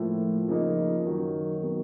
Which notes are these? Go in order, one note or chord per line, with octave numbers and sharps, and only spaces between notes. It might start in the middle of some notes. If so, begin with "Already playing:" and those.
Already playing: A2 F3 A#3
C#3 F3 A#3 D#4
F#2 D#3 F#3
D#3 F#3 B3